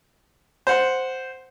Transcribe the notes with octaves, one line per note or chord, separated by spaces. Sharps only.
C5 F#5